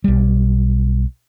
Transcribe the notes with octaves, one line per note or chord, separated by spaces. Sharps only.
B1 G3